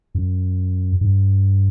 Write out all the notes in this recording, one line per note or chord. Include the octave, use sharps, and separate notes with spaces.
F#2
G2